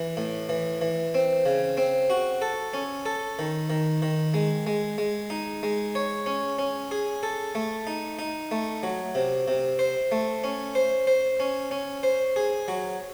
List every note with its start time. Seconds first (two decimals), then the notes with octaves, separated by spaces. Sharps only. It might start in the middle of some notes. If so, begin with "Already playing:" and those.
Already playing: E3
0.17 A2
0.49 E3
0.81 E3
1.14 C4
1.46 C#3
1.77 C4
2.10 F#4
2.42 A4
2.74 C#4
3.06 A4
3.39 D#3
3.70 D#3
4.02 D#3
4.34 G#3
4.67 G#3
4.98 G#3
5.30 D#4
5.63 G#3
5.95 C#5
6.26 C#4
6.59 C#4
6.91 G#4
7.23 A4
7.55 A3
7.87 D#4
8.19 D#4
8.51 A3
8.83 F#3
9.15 C3
9.48 C3
9.79 C5
10.12 A3
10.44 C#4
10.75 C5
11.07 C5
11.40 C#4
11.71 C#4
12.03 C5
12.36 G#4
12.68 F#3